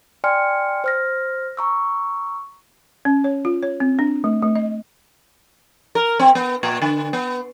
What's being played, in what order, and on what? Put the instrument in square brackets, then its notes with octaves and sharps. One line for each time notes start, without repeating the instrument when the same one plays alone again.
[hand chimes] D5 G5 G#5 C6 F6 C#7
C5 F6 A#6
A#5 C#6 E6
[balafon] C#4
C#5
F4
C#5
C4
D4
A3
A3
D#5
[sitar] A#4
C4
B3
A#2
D3
B3